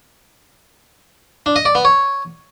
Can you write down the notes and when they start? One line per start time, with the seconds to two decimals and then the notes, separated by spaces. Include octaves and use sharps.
1.46 D4
1.56 D#5
1.65 D5
1.75 B3
1.85 C#5